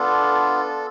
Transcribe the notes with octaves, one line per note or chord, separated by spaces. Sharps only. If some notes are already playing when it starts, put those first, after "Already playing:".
Already playing: B3 D4 F4 A4